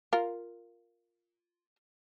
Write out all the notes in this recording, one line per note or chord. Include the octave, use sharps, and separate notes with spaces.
F4 A#4